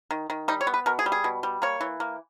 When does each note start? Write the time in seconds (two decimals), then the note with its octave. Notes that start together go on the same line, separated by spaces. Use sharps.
0.11 D#3
0.30 D#3
0.48 G3 D#4
0.61 C#5
0.67 B3
0.74 B4
0.86 B2 A#4
0.99 G#4
1.06 G3
1.12 G#4
1.24 B2
1.43 G3
1.62 A#3 C#5
1.81 E3
2.00 A#3